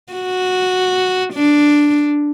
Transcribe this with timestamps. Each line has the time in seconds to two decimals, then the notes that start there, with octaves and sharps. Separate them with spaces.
0.13 F#4
1.33 D4